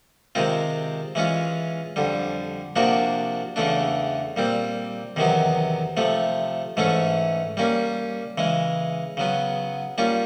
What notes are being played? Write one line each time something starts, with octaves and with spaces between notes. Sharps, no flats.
C3 D#3 G#3 C4 F4
E3 G#3 C#4 F4
F2 D3 G3
C3 F3 A#3 D4 F#4
E2 C#3 E3 A3 D4
A#2 G3 C4
E2 C3 D#3 F#3 B3
C3 F3 A3
G#2 E3 A3 C#4
G3 A#3 C#4
C#3 E3 G#3
C#3 F#3 B3
G3 A#3 C#4 F4